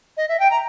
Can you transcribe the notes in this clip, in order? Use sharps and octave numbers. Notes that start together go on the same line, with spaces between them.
D#5
E5
G5
A#5